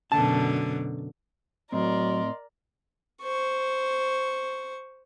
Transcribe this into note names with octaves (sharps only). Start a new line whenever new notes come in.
F#2 B2 D3 A5
A2 F#3 C4 A#4 D5 D#5 C6
C5 C#6